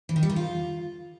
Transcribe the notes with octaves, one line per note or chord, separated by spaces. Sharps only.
E3
D#3
G3
D#3
F4